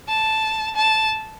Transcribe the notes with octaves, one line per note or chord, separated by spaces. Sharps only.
A5
A5